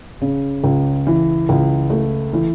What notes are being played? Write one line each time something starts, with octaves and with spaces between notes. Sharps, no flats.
C#3
C#2
E3
C#2
A3
E3